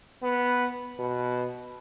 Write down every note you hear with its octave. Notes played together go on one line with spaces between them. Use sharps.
B3
B2